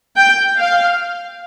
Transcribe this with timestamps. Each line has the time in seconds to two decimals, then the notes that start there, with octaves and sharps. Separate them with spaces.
0.18 G5
0.58 F5